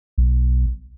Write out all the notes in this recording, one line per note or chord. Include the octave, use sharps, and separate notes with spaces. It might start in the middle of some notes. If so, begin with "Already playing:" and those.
B1